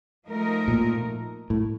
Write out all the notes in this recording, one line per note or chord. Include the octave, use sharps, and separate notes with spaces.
F3 A3 D#4 A#4
A#2
A2